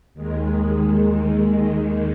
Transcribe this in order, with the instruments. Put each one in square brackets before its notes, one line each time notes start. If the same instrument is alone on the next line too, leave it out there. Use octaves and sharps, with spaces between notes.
[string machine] D#2 D#3 G#3